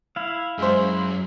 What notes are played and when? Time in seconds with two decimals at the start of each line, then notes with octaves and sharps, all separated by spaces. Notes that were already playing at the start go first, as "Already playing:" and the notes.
0.16 E4 F5
0.58 F#2 G#3 C5